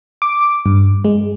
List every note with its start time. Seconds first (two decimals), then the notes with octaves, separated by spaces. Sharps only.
0.22 D6
0.66 G2
1.05 G#3